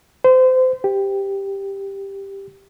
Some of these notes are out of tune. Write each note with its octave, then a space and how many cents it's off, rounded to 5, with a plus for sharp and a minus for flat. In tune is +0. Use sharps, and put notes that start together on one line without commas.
C5 -30
G4 +5